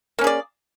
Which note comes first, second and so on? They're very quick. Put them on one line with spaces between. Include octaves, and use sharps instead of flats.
A#3 C#4 G#4 D5